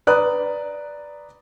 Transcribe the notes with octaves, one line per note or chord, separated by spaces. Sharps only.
B4 D5 A#5 D#6 F#6